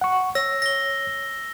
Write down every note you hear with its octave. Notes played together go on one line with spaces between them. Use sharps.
F#5 C#6
C#5 E6 A#6
A#6 G7